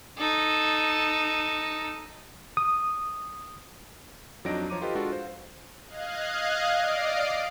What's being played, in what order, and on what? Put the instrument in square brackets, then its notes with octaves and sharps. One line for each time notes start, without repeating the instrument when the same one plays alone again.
[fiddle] D#4 A4
[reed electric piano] D#6
[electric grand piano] F2 F#3 D4 D#4 A#6 D7
F3 C#5 A#5 D6 D#7
F4 G4 A4 B4 D#5
G#3 D4 F4 F#4 A4
C5 F5
[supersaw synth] D#5 F5 F#6 G#6
D5 D#5 F5 C7 D7